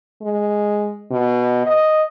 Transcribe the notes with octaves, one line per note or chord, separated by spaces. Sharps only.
G#3
B2
D#5